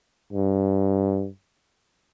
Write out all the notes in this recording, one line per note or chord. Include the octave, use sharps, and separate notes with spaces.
G2